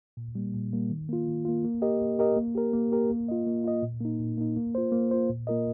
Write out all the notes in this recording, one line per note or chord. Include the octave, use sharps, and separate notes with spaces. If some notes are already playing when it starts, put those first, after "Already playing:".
A#2
G3 A#3
A#2
G3 A#3
D#3
A#3 F4
D#3
A#3 F4
A#3
G4 A#4 D#5
A#3
G4 A#4 D#5
A#3
G4 A#4
A#3
G4 A#4
A#3
F4 D#5
A#3
F4 D#5
A#2
A#3 D#4
A#2
A#3 D#4
A#3
F4 C5
A#3
F4 C5
A#2
A#3 F4 A#4 D#5